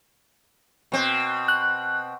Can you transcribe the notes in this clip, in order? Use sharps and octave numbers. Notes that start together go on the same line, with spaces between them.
B2 C4
F#6